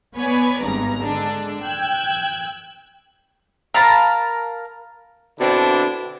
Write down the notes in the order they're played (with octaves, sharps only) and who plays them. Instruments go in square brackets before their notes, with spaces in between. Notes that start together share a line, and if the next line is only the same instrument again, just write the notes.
[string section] B3 B4 C#5 D5 G#5
G#1 G2 B3 A#5
D3 G#3 D4
G5 E6 F#6 G#6
[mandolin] A#4 F5 A5 B5
[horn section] B2 D3 C4 D4 E4